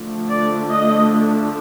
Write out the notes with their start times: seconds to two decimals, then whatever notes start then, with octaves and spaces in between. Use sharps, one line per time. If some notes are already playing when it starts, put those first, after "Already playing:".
Already playing: D3 F3 A3 D4
0.30 D5
0.69 D#5